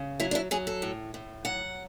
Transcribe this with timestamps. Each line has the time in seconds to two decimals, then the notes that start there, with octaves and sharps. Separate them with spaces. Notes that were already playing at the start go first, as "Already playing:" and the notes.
Already playing: C#3
0.20 F#3 E4
0.31 D4
0.35 E4
0.51 F#3 G#4
0.67 A4
0.82 A2
1.14 A2
1.45 F#3 F#5